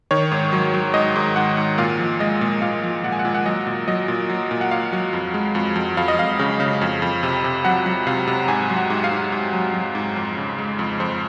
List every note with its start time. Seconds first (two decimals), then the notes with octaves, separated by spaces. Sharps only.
0.11 D#3 C#5
0.31 G#2
0.52 F#3
0.74 F#3
0.94 G#2 D#5
1.16 G#2
1.36 G#2 F#5
1.57 G#2
1.78 A#2 F5
1.99 F3
2.20 G#3 D#5
2.41 A#2
2.61 A#2 F5
2.83 F3
3.03 A#2 F#5
3.12 G#5
3.19 F#5
3.25 A#2 G#5
3.34 F#5
3.46 F#3 D#5
3.67 A#2
3.88 F#3 D#5
4.08 A#2
4.29 F#3
4.51 A#2
4.61 F#5
4.71 A#2 F5
4.93 F#3
5.13 F2
5.34 G#3
5.55 F2
5.76 F2
5.97 F2 F5
6.08 D#5
6.19 F2 F5
6.39 C#3
6.60 C#3
6.81 F2
7.02 F2
7.23 C3
7.44 C3
7.65 F#3 F#5
7.86 F#3
8.07 C3 F5
8.27 C3
8.42 A#5
8.48 G#2 G#5
8.69 F#3
8.76 F#5
8.90 G#2
9.04 F5
9.11 G#2
9.32 G#2
9.53 F#3
9.74 F#3
9.95 G#2
10.16 F2
10.37 C#3
10.58 G#3
10.79 F2
11.00 F2 C5